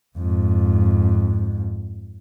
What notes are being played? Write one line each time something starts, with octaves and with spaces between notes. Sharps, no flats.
F2 G#2